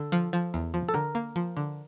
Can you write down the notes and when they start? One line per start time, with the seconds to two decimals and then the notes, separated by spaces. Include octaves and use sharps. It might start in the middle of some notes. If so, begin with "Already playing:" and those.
Already playing: D3 A4
0.12 F3
0.33 F3
0.54 E2
0.74 F3
0.89 A4
0.94 D3 A#4
1.15 A#3
1.36 F3
1.57 D3